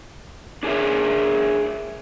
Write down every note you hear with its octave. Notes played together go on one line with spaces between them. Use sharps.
D4 G#4 A#4 C#5 E5